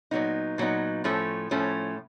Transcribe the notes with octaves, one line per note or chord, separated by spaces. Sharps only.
A#2 F#3 B3 D#4
A#2 F#3 B3 D#4
A2 F3 A3 C#4
A2 F3 A3 C#4